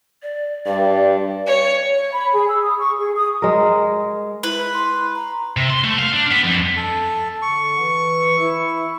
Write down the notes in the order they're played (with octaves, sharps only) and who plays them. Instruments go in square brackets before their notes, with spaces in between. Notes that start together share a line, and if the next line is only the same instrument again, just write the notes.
[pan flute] D5
[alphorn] G2 [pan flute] D5
[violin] C#5
[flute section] C#5
B5
G#4
E6
D#6
C#6
G#4
D#6
[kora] G#3 A#4
[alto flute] E4 [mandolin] B4
[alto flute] C6
A#5
[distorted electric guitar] C3
C6
A3
F5
D4
B3
F2
[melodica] A4
[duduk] D3 [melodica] C#6
[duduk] E3
E4